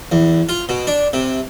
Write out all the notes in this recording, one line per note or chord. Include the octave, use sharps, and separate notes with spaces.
E2
F4
B2
D4
C3